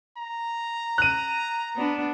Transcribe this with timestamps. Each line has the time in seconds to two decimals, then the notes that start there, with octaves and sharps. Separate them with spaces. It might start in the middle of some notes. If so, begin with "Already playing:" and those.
0.17 A#5
0.98 F#6 D#7
1.76 B3 D4